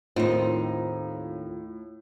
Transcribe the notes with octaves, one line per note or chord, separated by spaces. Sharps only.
D#2 A2 C4 D#4 F4